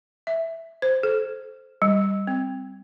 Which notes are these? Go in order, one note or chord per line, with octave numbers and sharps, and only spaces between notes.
E5
C5
A4
G3
C4